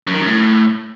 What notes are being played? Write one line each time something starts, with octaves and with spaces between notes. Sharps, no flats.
F#2
D#3
F#2
A2